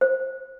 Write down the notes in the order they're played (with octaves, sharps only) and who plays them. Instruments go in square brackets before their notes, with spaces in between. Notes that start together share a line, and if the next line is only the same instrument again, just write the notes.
[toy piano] C5